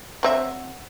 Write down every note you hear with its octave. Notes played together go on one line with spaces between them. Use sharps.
F#3 C4 E5